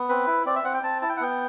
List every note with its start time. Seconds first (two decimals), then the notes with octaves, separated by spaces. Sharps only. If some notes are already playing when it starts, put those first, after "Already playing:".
Already playing: B3
0.09 C4 B4
0.27 E4
0.46 C4 D5
0.56 E5
0.64 C4 F#5
0.74 G5
0.83 C4 A5
1.01 E4 A5
1.09 G5
1.16 F#5
1.21 B3 G5